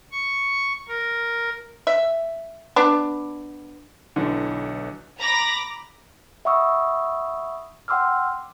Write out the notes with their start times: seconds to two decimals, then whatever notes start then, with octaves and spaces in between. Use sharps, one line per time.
0.12 C#6
0.88 A#4
1.87 E5
2.76 B3 D4
4.16 B1 D3 E3
5.18 A#5 B5 D6 A#6
6.45 E5 F#5 B5 C#6 D#6 E6
7.88 F#5 G5 C6 D6 E6 F6